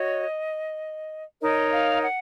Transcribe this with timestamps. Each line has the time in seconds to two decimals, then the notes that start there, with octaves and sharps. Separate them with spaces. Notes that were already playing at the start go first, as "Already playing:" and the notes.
Already playing: F#4 C#5 D#5
1.42 D#4 A#4 C#5 D#5
1.72 F5
2.02 F#5